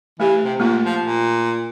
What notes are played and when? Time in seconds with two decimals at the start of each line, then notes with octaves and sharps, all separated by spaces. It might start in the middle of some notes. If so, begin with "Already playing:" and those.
0.20 E3 A3 G4
0.45 C3
0.60 A#2 A3 A#3 F4
0.85 F3
1.02 A#2